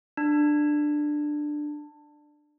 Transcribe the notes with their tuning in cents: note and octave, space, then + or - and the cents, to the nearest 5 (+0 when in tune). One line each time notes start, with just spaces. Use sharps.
D4 +15